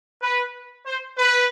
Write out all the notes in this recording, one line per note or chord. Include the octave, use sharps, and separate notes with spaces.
B4
C5
B4